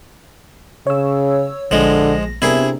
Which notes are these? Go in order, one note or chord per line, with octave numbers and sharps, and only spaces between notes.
C#3 C#5 E6
A#1 D3 F3 G#3 A#6
C3 B3 D4 E4 G#4 A#4